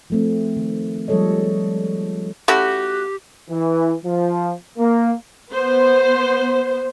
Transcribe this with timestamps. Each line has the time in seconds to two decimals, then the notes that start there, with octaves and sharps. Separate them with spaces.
0.10 F3 A3 C4
0.57 D#3
1.08 F3 G3 G#3 A4 C#5 D#5
2.48 A3 C#4 E4 F#4 G4
3.50 E3
4.04 F3
4.79 A#3
5.52 B3 C5